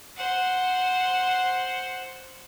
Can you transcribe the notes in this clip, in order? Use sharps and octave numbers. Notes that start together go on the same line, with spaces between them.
C5 F#5